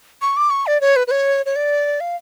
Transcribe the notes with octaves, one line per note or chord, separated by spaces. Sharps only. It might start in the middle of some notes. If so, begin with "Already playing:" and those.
C#6
D6
C#6
D5
C#5
B4
B4
C#5
C#5
D5
F5